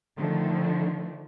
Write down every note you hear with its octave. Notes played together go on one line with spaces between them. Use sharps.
D3 D#3 F3 A3